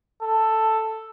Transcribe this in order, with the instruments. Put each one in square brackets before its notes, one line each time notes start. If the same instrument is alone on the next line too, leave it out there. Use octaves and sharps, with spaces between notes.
[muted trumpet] A4